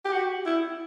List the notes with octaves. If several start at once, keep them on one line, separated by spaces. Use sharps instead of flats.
G4
F#4
E4